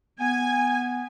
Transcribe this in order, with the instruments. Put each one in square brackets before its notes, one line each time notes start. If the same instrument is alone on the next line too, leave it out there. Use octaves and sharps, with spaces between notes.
[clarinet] B3 [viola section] G#5